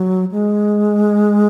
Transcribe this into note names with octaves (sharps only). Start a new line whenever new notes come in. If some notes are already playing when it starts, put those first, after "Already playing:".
Already playing: F#3
G#3